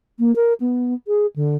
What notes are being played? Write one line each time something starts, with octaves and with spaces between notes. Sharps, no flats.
A#3
A#4
B3
G#4
D3